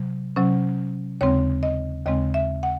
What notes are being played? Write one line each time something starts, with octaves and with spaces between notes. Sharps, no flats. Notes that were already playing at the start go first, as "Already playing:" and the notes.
Already playing: C3 F#3
C3 F#3 C#4
D#2 C#3 G#3 C4 C#5
D#5
D#2 C#3 G#3 C4 D#5
E5
F#5